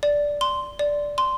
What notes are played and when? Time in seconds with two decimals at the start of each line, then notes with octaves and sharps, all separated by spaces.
0.03 D5
0.41 C6
0.79 D5
1.18 C6